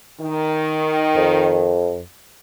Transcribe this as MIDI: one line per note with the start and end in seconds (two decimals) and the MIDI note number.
0.18 1.74 51
1.16 2.02 41